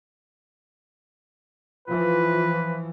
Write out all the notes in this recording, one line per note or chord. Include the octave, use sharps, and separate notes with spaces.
E3 F3 F4 B4